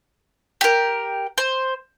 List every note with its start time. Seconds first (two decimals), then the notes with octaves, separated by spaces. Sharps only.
0.61 G4 A#4
1.38 C5